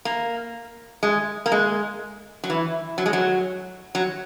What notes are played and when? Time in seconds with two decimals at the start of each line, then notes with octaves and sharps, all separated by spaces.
0.05 A#3
1.03 G#3
1.46 A#3
1.52 G#3
2.44 F#3
2.50 E3
2.98 F#3
3.06 G#3
3.13 F#3
3.95 F#3